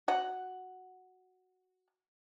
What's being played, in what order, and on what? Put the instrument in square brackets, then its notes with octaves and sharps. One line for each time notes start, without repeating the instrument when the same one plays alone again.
[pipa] F#4 F#5